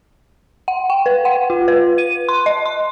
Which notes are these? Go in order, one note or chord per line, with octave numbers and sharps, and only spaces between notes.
F#5
G5
B4
F#5
F4
B4
D#7
C6
D#5
C6